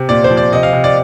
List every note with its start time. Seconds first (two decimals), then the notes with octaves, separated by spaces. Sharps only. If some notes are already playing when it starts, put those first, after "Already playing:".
Already playing: C3
0.09 A#2 D5
0.24 C5
0.31 F3
0.37 D5
0.52 C3 D#5
0.63 F5
0.73 C3
0.84 D5